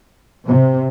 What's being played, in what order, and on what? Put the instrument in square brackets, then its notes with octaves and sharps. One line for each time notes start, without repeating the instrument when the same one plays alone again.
[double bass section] C3